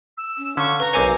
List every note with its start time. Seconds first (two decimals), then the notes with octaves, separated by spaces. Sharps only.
0.17 E6
0.38 C#4
0.57 D3 C#4 F5 C#6
0.80 B4 A#5
0.93 B1 C4 A#4 B4 C#5 G#5 D6